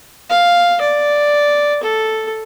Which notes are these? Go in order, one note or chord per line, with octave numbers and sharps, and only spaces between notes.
F5
D5
A4